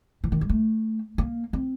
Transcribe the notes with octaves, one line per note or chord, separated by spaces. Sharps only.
E3
D#3
G#3
A3
A#3
C4